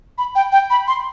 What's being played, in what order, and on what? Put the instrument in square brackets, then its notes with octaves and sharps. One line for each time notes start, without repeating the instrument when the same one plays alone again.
[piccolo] B5
G5
G5
B5
C6